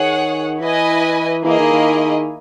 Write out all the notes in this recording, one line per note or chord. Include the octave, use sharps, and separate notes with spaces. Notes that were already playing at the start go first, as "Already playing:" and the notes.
Already playing: D#3 G#4 C#5 F#5
E3 E4 B4 D#5 G#5
E3 A#3 E4 G#4 D#5 G#5
D#3
D#3